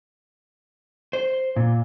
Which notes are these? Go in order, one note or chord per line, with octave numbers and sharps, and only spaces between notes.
C5
A#2